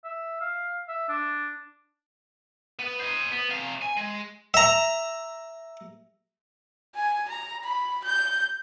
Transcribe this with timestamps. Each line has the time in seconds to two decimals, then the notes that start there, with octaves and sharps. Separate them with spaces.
0.04 E5
0.41 F5
0.88 E5
1.09 D4
2.79 B3
3.00 C5 D#5
3.32 B3
3.50 C3 F5
3.82 G#5
3.97 G#3
4.54 E5 A#5
6.95 G#5
7.29 A#5
7.63 B5
8.04 G6